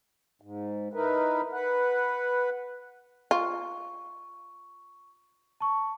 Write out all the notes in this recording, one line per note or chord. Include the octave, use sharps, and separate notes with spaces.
G#2
D#4 E4 A#4 B4
B4 F#5
F4 C#6
A5 C#6